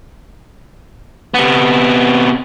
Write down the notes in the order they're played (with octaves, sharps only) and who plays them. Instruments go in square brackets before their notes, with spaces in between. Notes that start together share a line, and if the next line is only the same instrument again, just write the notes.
[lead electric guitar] C3 B3